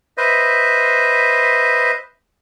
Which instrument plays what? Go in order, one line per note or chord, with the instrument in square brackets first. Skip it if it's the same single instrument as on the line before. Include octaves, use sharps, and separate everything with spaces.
[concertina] B4 C5 D#5 E5